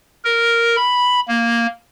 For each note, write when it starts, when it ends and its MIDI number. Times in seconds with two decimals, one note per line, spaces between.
0.24 0.76 70
0.76 1.20 83
1.28 1.66 58